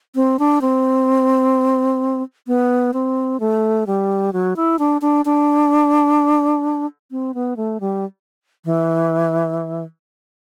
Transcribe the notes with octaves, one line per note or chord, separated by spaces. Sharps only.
C4
D4
C4
B3
C4
A3
G3
F#3
E4
D4
D4
D4
C4
B3
A3
G3
E3